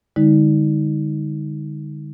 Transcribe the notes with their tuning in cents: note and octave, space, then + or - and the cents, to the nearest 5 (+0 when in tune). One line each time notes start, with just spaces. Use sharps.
D3 +10 G#3 -40 D#4 +30